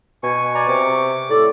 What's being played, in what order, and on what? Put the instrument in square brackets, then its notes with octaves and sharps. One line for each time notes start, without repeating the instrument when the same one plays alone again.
[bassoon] B2 [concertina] G#5 [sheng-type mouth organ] C#6
[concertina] D5 G#5 A#5
[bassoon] C3 [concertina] D6
[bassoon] A2 [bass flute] A4 [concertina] D5